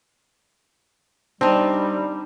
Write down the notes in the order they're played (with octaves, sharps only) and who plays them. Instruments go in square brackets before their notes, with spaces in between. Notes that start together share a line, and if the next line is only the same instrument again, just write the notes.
[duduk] G3 [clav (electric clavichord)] C4 [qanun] D4 D#4